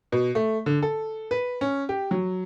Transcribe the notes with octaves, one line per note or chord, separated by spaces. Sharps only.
B2
A3
D3
A4
B4
C#4
G4
F#3